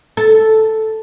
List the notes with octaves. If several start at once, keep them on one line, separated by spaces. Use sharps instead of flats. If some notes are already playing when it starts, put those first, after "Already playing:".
A4